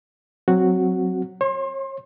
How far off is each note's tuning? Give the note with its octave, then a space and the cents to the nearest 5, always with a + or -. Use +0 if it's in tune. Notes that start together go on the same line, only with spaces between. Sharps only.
F#3 +0 C4 +0 F#4 +0
C#5 -35 C6 +25